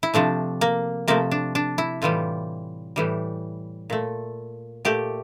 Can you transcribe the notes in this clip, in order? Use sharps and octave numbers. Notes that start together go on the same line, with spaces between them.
E4
C3 F3 A3 D4
A#3
C3 F3 A3 A#3
D4
D4
E4
A2 E3 G3 F4
A2 E3 G3
A#2 A3
A#2 A3 G4